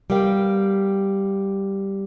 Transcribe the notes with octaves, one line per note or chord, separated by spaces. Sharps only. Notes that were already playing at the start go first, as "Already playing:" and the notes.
G3 B3 A#4 F5 G5